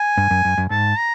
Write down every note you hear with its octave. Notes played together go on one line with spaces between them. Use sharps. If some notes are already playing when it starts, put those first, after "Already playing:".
Already playing: G#5
G2
F#2
F#2
F#2
G#2 A5
A#5